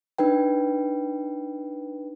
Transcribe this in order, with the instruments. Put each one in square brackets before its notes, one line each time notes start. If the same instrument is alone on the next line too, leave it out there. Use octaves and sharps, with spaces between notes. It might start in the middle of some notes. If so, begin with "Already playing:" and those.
[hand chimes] D4 D#4 B4 G5